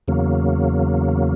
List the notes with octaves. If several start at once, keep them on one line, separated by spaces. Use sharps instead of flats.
E2 C#3 F#3 A#3